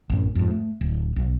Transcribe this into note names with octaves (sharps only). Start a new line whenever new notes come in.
A1 F#2
F2 G#2
A3
D1
B1